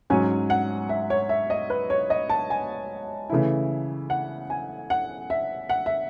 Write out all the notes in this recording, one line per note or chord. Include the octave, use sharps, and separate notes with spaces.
G#2 F#3 C#4 G#5
F#5
E5
C#5
E5
D#5
B4
C#5
D#5
A5
G#5
C#3 E3 A3 E4
F#5
G#5
F#5
E5
F#5
E5